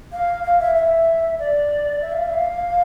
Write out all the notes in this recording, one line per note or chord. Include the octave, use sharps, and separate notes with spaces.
F5
F5
E5
E5
D5
E5
F5
E5
F5